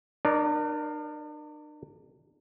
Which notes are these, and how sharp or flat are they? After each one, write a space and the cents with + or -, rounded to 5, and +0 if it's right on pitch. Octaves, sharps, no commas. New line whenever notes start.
D4 +45 A#4 +20 D5 -25